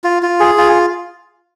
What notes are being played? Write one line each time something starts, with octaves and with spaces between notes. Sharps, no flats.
F4
F4
G#4
F4